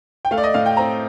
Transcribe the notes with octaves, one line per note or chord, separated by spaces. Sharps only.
G5
A3 F5
D5
D#5
A2 F5
G5
C4 A#5